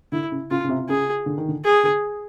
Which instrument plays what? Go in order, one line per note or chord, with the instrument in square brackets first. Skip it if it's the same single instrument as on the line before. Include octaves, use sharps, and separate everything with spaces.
[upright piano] D3 [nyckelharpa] E4
[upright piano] C#3
[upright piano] C#3 [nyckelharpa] F4
[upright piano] C#3
C3
C3
[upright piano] C#3 [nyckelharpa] G#4
[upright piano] D3
D#3
D3
[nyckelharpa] G#4
[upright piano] D3